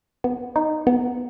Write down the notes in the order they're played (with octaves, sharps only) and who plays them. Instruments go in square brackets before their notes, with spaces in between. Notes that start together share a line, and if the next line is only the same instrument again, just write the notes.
[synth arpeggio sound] B3
D#4
B3